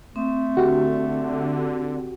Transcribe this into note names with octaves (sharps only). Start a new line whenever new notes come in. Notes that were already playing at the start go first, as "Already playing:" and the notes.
A3 C4
D3 F#4 G4